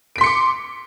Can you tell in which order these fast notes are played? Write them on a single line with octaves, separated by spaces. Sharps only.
D7 B6 C6 C#7 D6